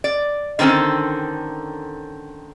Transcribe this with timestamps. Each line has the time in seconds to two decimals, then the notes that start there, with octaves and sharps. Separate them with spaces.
0.04 D5
0.59 D3 D#3 C4 C#4 A4